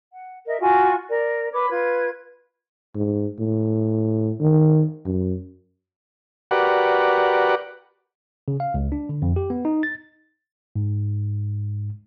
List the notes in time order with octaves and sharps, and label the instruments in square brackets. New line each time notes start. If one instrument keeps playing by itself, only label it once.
[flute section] F#5
A#4 D#5 E5
F4 F#4 G#5
A#4 D5
B4 C#5 B5 D6
F4 B4 G#6
[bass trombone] G#2
A2
D#3
F#2
[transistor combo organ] F#4 G4 A#4 B4 D5 F#5
[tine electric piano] C#3
F5
C#2
D4
D3
F2
G4
B3
D#4
A6
G#2